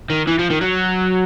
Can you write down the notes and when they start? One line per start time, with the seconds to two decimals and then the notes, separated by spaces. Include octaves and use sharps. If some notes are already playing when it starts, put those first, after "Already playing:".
0.10 D#3
0.28 E3
0.39 F3
0.50 D#3
0.61 F#3